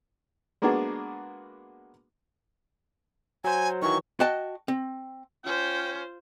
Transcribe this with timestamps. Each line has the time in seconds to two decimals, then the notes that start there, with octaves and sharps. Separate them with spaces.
0.62 G#3 A#3 B3 D4 F#4 G#4
3.44 F#3 C5 G#5
3.82 D#3 E3 F#3 C#6
4.20 F#4 D#5 G5 A5
4.68 C4
5.44 C#4 F4 C5 G5